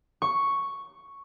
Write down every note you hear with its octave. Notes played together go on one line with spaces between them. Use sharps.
C#6